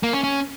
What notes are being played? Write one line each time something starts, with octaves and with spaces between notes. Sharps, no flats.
A#3
C#4
C#4